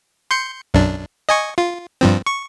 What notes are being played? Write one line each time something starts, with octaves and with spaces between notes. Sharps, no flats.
C6 G6 C#7
B1 F#2 D4
D#5 G#5 C#6
F4
G2 F3 C4
C#6